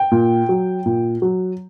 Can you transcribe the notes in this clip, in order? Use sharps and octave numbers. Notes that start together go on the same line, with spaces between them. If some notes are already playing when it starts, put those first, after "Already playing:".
Already playing: G5
A#2
F#3
A#2
F#3